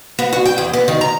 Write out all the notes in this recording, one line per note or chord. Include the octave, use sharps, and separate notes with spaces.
B3
F#4
G5
E2
B3
D#3
A#5